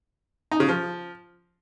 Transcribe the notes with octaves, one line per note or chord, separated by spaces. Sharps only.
D#4
C#3
F3